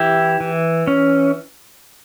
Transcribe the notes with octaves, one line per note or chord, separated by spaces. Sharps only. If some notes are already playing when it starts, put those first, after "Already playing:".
Already playing: E3 E4 G4
E3
C#4